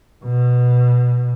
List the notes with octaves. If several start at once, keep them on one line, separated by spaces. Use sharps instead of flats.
B2